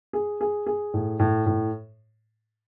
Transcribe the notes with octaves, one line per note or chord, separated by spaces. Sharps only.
G#4
G#4
G#4
A2
A2
A2